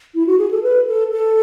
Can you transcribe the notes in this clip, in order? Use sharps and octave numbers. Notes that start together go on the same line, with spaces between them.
E4
F#4
G#4
A4
B4
A4
A4